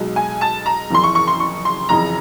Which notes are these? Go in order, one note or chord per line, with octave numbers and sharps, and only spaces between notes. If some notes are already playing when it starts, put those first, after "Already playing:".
Already playing: B1 B2 G#3
G#5
A5
A#5
F#1 F2 C#3 E3 C6
C#6
C#6
C6
C#6
C6
F#1 F2 C#3 E3 A#5